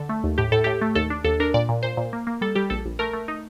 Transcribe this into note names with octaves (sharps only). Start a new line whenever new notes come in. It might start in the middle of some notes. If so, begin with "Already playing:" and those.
Already playing: D3 A4
A3
D#2
A2 G4
A2 A4
A2 G4
A3
D#2 A4
D4
D#2 A4
D4 A#4
A#2 D5
A#2
A#2 C5
A#2
A#3
A#3
G3 A4
G3 G4
A#1 A4
A#1
A3 A#4
A3
D#4